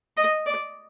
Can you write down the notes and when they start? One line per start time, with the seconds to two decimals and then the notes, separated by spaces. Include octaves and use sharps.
0.17 D#5
0.46 D5